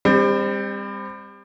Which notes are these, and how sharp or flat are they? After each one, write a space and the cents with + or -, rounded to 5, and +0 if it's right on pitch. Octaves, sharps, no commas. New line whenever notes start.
G3 +35 C4 +0